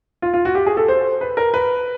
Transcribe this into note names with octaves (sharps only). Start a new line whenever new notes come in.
F4
F4
F#4
G4
G#4
A4
C5
B4
A#4
B4